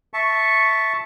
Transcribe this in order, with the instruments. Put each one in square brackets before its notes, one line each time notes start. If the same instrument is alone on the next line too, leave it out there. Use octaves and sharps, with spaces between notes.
[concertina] E5 A5 C#6